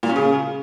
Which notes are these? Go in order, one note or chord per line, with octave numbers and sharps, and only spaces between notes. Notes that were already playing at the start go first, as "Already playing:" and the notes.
A#2
C#4
C#3